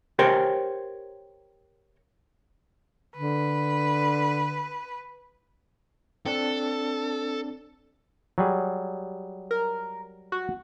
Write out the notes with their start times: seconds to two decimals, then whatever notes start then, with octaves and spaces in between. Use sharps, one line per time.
0.19 G4 A#4 C5 C#5 G5
3.17 D3 B4
6.26 C4 D4 A4
8.38 F#3 G3 G#4
9.51 A#4
10.32 F#4